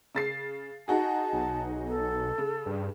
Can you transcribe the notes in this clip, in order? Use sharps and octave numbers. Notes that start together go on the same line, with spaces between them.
C#3 A6 C7
D#4 F#4 G#4 A5
B1
A4
C#3
G2